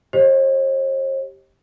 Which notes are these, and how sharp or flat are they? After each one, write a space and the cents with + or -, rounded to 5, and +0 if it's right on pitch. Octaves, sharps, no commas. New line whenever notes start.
G4 +0 C5 +45 D#5 +0